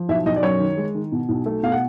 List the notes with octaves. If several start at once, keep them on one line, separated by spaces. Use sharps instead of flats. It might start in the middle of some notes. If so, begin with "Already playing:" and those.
Already playing: F3
B1 E5
B1 D#5
D5
F#2 C#5
D#3
G#3
D#3
B2
B1
A3
B2 F5
F#5